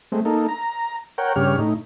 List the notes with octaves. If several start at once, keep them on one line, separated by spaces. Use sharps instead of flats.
G#3 A3 C4
A#3 D#4 A4
A#5
A#4 C#5 F#5 G5
G2 C#3 G4 C#5 F6
A2 D#4